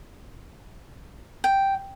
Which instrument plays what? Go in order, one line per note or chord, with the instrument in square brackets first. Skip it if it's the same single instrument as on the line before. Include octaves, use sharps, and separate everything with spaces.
[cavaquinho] G5